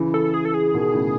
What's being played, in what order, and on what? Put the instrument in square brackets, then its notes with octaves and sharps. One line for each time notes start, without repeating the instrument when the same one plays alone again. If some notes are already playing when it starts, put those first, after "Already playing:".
Already playing: [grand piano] C#3 E3
[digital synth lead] A4
G#4
A4
G#4
[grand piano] B2 D#3
A2 C#3